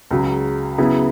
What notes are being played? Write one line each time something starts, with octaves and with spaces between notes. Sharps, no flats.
C#2 C#3 F#3
C#3 F#3 B3 E4 G#4